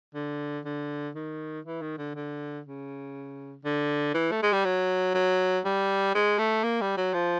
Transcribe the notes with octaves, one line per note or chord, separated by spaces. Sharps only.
D3
D3
D#3
E3
D#3
D3
D3
C#3
D3
E3
A3
G#3
G3
F#3
F#3
G3
G#3
A3
A#3
G3
F#3
F3